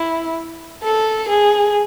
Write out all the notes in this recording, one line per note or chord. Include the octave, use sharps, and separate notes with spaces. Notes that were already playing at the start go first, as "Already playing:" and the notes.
Already playing: E4
A4
G#4